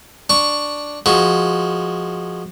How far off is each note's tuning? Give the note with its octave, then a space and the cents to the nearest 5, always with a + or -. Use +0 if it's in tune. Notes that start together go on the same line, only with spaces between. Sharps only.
D4 +0 C#6 +0
F3 +0 G#3 +0 F#4 +0